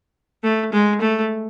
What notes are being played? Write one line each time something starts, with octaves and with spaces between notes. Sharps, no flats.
A3
G#3
A3